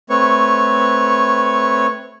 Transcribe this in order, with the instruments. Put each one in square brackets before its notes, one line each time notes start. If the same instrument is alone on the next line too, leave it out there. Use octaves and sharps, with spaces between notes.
[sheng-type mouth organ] A3 C4 B4 C#5 C#6